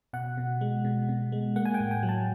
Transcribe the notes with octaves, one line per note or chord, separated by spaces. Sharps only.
B2 F#5
B2
G#3
B2
B2
G#3
A#3 F#5
G#5
G5
A2
G#5
F#3
A5